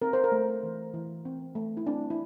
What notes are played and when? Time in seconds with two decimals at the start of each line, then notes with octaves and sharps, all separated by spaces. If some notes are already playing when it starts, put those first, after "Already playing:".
0.02 C4 A#4
0.13 C5
0.24 A#4
0.32 A3
0.63 E3
0.94 E3
1.25 C4
1.55 A3
1.77 E4
1.87 C4 D4
2.10 E4